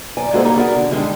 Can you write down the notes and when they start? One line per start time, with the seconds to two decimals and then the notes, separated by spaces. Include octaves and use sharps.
0.17 F#2 D5 G#5
0.33 G#3 A#3 F#4 G#4 A4 C5
0.44 G3 A#3 D#4 C#5
0.56 B3 F#4 G#4 A#4 D5 F#5
0.76 D3
0.91 D3 D#3 G3 G#3 D4 D#4